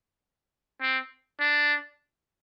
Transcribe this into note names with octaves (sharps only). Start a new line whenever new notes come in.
C4
D4